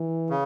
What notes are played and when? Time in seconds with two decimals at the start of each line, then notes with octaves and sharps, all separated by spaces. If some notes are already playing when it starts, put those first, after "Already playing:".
Already playing: E3
0.30 C#3